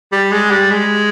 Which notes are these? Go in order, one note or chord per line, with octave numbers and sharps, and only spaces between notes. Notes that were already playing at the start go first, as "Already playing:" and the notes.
G3
G#3
G3
G#3